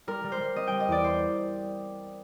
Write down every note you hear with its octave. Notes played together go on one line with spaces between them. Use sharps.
G3 A#4
G3
C5
G3
C4 D#5
G3 G5
D#5
E2 D5
C5